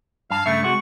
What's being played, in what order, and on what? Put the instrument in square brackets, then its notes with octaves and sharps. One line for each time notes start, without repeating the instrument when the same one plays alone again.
[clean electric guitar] G2 A5 [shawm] F5 [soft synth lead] C7
[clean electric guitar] G2 C#3 A3 [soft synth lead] E5 [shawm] C#6
[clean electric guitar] C3 F#4 [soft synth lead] G#3 [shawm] C#6